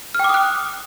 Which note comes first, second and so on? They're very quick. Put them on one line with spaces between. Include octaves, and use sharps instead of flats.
F6 G5 D6 D#6 F#6